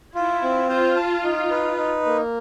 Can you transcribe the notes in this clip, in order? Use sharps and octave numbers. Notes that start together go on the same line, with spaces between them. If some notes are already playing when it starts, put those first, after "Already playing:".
E4 F4
C4
F4 C5
A5
D#4
B4
D#4
A#3